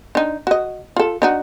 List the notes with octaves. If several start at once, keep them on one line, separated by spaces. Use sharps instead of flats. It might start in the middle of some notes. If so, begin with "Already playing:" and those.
D4 D#4
F#4 D#5
F4 A4
D4 D#4 F#4